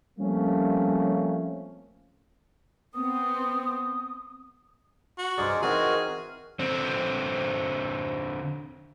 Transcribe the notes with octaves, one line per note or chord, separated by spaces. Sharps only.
F3 G3 A3 A#3 C4 C#4
B3 C4 D#6
F#4
C2 G2 G#4 C5 D5 D#5 A#5 F6
E3 C4 D#4 F#4 G#4 A#4 D#5 F6
D3 C4